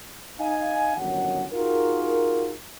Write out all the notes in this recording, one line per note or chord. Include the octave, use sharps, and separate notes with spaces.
D#4 F5 G#5
G1 D#2 D#3 F#3 C#4 F#5
D#4 F4 F#4 G#4 A#4